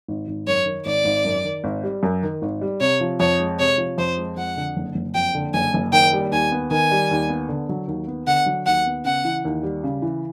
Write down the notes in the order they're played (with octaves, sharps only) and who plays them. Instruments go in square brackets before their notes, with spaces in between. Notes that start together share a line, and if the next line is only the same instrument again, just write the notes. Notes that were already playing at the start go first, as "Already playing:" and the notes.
[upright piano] G#1
G#1
[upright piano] F#2 [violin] C#5
[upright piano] D#3
[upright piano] G#1 [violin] D5
[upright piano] G#1
F#2
D#3
G#1
G3
F#2
D#3
G#1
G3
[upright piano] C3 [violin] C#5
[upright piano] F3
[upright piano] F2 [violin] C#5
[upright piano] G#3
[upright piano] C3 [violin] C#5
[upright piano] F3
[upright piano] F2 [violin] C5
[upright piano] G#3
[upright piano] F2 [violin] F#5
[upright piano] D3
F#1
F#1
[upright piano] F2 [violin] G5
[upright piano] D3
[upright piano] F#1 [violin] G#5
[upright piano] F#1
[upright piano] D#3 [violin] G5
[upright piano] G3
[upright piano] D#2 [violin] G#5
[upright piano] B3
[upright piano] D#3 [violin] G#5
[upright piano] G3
D#2
B3
D3
F#3
D#2
B3
[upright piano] D3 [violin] F#5
[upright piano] F#3
[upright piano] D#2 [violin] F#5
[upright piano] B3
[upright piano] C#3 [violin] F#5
[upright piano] E3
D#2
G3
C#3
E3